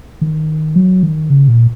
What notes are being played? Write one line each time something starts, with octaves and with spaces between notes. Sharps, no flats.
D#3
F#3
D#3
C#3
A#2